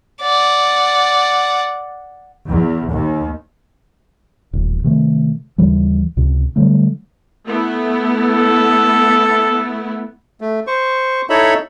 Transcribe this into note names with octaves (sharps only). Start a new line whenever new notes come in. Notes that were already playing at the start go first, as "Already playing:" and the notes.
D5 F#5
E2
D#2
D#1 A1
C3 D#3 A3
D#2 C#3 E3 G3
C#2 C3
D3 F#3 G3 A3
A3 B3 E4
A4
A3
C5 C#6
D#4 E4 A4 C#5 E5 B5